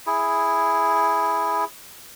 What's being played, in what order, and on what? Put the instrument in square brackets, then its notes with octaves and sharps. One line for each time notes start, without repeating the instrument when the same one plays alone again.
[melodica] E4 G#4